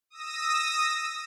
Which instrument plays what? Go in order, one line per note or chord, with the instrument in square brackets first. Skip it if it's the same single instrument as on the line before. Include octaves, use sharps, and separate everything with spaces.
[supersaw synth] D#6 E6 A#6